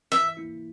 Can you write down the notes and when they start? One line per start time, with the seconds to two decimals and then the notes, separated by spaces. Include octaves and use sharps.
0.12 E3 E5
0.37 A#3 E4